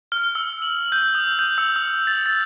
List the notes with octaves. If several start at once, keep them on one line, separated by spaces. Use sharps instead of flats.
F6
E6
F#7
G6
D#6
G6
E6
E6
A6
A6